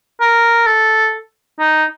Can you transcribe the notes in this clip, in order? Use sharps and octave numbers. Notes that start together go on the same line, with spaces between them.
A#4
A4
D#4